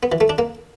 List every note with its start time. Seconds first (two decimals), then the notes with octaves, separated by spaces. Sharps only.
0.03 B3
0.12 E3
0.21 A3
0.29 D4
0.38 A#3